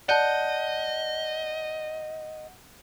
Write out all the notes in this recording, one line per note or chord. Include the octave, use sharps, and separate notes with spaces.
D5 D#5 F#5 A5 G6